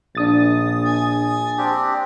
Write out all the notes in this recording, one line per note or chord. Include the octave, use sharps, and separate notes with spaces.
A#1 D4 D#6 A6
G#5
C4 D4 G4